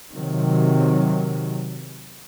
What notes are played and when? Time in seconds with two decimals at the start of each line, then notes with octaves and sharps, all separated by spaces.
0.12 C3 D#3 F#3